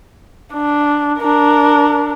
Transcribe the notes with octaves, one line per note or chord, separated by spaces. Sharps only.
D4
D4 A#4